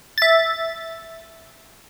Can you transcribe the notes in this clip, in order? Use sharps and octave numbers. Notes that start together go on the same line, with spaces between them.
E5 A6